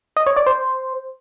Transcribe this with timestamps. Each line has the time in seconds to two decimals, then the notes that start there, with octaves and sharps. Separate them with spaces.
0.16 D#5
0.26 C#5
0.36 D5
0.46 C5